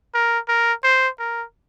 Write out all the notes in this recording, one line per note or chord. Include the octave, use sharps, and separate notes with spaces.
A#4
A#4
C5
A#4